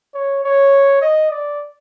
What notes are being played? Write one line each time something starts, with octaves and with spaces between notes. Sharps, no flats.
C#5
C#5
D#5
D5